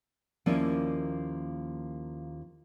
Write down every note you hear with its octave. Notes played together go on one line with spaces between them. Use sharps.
D#2 F3 A#3 C#4 E4 D5